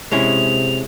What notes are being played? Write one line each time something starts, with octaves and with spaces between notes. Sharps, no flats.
C3 G#3 C#4 E4 F7